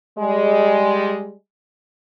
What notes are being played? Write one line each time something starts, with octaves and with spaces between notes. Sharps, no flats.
G3 G#3